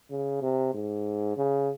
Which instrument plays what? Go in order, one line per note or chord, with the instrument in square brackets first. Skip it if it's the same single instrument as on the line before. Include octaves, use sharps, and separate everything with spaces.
[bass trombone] C#3
C3
G#2
C#3